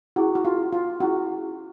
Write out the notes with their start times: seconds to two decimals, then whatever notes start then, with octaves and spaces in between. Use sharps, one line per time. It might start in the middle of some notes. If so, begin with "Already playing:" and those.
0.16 C#4 E4 F#4 G#4
0.35 F#4
0.45 F4
0.72 F4
1.00 C#4 E4 F#4 G#4